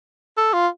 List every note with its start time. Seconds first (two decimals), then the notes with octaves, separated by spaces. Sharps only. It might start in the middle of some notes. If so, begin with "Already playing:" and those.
0.37 A4
0.53 F4